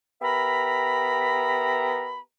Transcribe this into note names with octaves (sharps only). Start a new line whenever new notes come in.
B3 G4 A#4 E5 A#5 B5